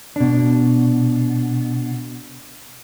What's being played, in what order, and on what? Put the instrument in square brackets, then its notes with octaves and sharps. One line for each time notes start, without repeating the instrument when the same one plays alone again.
[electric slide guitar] B2 D4